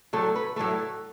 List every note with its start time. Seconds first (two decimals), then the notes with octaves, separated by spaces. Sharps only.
0.13 A2 F#3 A3 A4
0.36 B4
0.56 A2 F#3 A3 A4